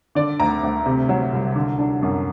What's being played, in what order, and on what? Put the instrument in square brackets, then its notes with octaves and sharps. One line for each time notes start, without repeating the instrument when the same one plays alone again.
[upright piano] D3 D5
D2 A#5
D2
C3
F#3
C2
D3
D4
F#2